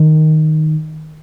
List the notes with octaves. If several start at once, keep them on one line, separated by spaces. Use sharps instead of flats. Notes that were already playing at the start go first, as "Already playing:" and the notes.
Already playing: D#3